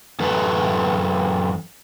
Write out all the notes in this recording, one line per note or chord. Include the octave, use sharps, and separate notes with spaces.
F#2 E3 A4 B4